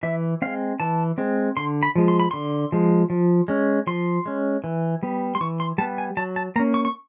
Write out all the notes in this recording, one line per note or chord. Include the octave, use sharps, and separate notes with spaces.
E3 E5
G#3 C4 F5
E3 A5
G#3 C4
D3 C6
B5
F3 G#3
C6
B5
D3 C6
F3 G#3
F3
G#3 C#4
F3 C6
G#3 C#4
E3
G3 B3
C6
E3 C#6
C6
G3 B3 A5
G#5
F#3 A5
A5
A#3 C#4 A#5
C#6
C#6